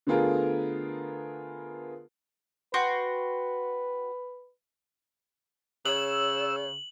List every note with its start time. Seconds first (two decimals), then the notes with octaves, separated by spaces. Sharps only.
0.07 D3 A3 B3 F4 G#4 A#4
2.74 F#4 B4 G5 C6
5.86 C#3 C#5 E6 F#7